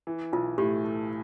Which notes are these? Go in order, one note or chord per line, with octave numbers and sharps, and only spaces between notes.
E3
B1 F4
A2 G4
A3